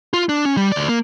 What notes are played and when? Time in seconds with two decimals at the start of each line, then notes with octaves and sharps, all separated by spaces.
0.13 F4
0.29 D4
0.45 C#4
0.57 G3
0.72 D2 D5
0.89 A#3